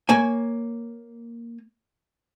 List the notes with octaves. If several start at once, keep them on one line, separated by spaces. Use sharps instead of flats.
A#3 C#5 G#5